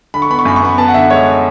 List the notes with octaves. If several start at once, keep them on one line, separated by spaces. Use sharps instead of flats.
D3 B5
C#6
B3 B5
C#6
F#2 B5
C#6
B3 B5
B3 A5
F#5
D3 E5
G#3 C#5